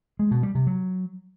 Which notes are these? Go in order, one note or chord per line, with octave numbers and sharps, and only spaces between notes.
G#3
B2
G3
C3
F#3